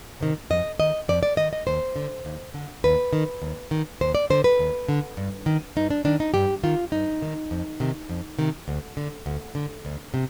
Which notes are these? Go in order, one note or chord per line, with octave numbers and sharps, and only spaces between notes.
C3 D#3
F2 D#5
D#3 D#5
F2 D5
D5
D#3 D#5
D#5
D#2 C5
D3
D#2
D3
D#2 B4
D#3
D#2
D#3
D#2 C5
D5
D3 C5
B4
D#2
D3
G2
D#3
G2 D#4
D4
D#3 D4
D#4
G2 G4
D#3 F4
G2 D#4
D#3
F2
C3 D#3
F2
C3 D#3
D2
D3
D2
D3
D2
C3